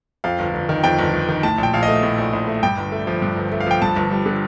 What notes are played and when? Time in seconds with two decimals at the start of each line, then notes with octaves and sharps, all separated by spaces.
0.24 F2 F5
0.39 G1
0.54 G1
0.69 D#3
0.84 F2 G5
0.99 G1
1.14 G1
1.29 D#3
1.43 A2 A5
1.58 A#1
1.63 G5
1.73 A#1 F5
1.83 D#5
1.88 A3
2.03 A2
2.18 A#1
2.33 A#1
2.47 A3
2.63 G2 G5
2.77 G1
2.92 A3
3.07 F3
3.22 G2
3.37 G1
3.52 A3
3.60 F5
3.67 F3 G5
3.82 G2 A5
3.96 G1
4.11 G3
4.26 D3